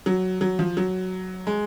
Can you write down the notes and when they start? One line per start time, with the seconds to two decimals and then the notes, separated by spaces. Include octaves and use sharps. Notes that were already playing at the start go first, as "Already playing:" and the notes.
0.06 F#3
0.41 F#3
0.59 F3
0.77 F#3
1.47 G#3